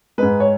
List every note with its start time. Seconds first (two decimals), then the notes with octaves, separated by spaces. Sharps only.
0.18 G#2 G#3 B4
0.40 C#5